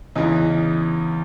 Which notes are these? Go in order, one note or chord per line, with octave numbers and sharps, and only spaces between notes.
E2 C#3 E3 D#4